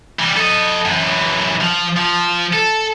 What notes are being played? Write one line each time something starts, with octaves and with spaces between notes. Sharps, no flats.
E3 G3
A4 D#5
F#2 E3
F3
F3
A4